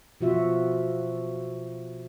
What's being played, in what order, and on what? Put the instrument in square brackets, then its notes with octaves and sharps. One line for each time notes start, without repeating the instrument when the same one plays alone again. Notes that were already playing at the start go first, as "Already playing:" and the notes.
[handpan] B2 F3 F4 F#4 E5